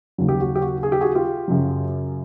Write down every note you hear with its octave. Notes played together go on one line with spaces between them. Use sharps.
D#2 C#3 F#3
G4
F#4
G4
F#4
G#4
G4
F#4 G#4
F4 G4
F#2 C#3 F#3